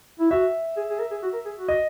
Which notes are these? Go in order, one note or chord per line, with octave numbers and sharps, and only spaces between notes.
E4
F#4 E5
G#4
G#4
A#4
G#4
F#4
A#4
G#4
F#4
D#5